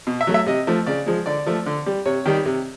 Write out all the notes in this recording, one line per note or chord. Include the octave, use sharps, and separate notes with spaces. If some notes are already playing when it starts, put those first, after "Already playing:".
B2
E5
F#3 A3
E5
C3 D#5
F3 A3
C#3 D5
F3 G#3
D3 D5
F3 A3
D3
G3
C3 C#5
D#3 G3
C3